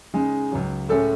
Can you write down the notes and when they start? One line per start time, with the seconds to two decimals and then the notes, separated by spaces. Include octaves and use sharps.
0.14 C#3 G#3 D#4
0.52 C#2 C#3 F#3
0.89 A2 G#3 C#4 A4